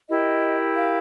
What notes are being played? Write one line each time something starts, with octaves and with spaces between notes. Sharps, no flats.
E4 G4 A#4 D#5
F5